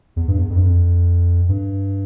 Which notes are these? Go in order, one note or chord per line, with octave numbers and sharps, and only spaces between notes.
E2
G2
E2
F2
G2
F2
G2